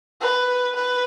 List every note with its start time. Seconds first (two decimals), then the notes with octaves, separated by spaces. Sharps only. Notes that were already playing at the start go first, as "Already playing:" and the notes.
0.21 B4
0.76 B4